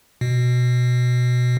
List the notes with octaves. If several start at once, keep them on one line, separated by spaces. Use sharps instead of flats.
B2